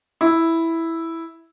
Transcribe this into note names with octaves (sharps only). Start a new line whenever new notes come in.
E4